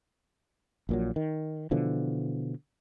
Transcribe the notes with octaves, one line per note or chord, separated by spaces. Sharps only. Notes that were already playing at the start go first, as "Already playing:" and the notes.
A#1 A#2 F#3
D#3
B2 D3 E3 F3